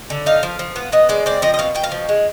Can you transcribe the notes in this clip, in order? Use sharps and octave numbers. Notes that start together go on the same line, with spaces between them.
D3
D#4 F5
F3
F3
B3
B3 D#5
G#3 D5
C4 D5
F3 D#5
D#5
B2 F5
B2 G5
F5
F3
G#3